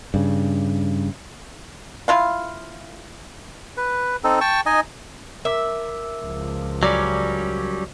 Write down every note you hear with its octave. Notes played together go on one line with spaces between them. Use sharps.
G2 C#3
E4 F4 F5
B4
C4 D#4 A4
G5 A5 C#6
D#4 D#5 G#5
A#4 E5 D6 E6
C#2 F3
F#3 G3 C#4 D5